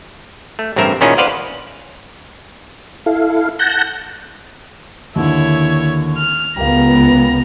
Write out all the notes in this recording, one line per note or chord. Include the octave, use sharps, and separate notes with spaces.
A3
A1 G2 C3 C4 A#4 E5
A#2 D#3 C#4 E4 F#4 G#4
B4 C5 D5 F5 F#5
E4 A4 F5
F#5 A5 F#6 G6 A#6
D#2 D3 E4 C#5
F6
C#2 B3 G4 A#4 F5 A#5